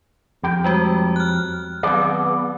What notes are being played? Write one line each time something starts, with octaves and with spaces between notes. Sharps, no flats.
F2 G4 G5
G3 G#3 F#4
F6 F#6
D#3 F#3 B3 C4 D5